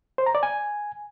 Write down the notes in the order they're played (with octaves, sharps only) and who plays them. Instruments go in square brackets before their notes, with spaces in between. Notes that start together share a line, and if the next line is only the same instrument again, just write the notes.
[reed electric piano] C5
A#5
D5
G#5